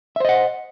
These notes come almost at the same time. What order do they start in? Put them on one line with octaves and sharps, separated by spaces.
E5 C5 D#5 F#5